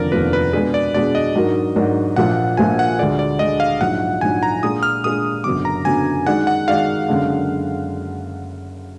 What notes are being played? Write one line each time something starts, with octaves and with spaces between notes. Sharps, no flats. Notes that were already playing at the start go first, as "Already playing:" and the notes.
Already playing: F1 D#2 D3 F3 B3 A#4 D5
F1 D#2 D3 F3 B3 B4
B4
B2 G#3 D4 G#4 B4
D5
B2 G#3 D4 G#4 D5
D#5
G#2 F#3 D4 F#4 A#4
G#2 F#3 D4 F#4 A#4
A#1 A#2 F3 A#3 F#5
A#1 A#2 F3 A#3 G#5
F#5
D2 D3 G#3 D5
D5
D2 D3 G#3 D#5
F5
A#1 G#2 F#3 F#5
A#1 G#2 F#3 G#5
A#5
A#2 G#3 D4 F4 G#4 D#6
F6
A#2 G#3 D4 F4 G#4 D#6
F#1 F#2 D3 F#3 B3 D6
A#5
F#1 F#2 D3 F#3 B3 G#5
D#3 G#3 D#4 F#4 D5 F#5
F#5
D#3 G#3 D#4 F#4 D5 F5
F#1 F#2 D3 G#3 D4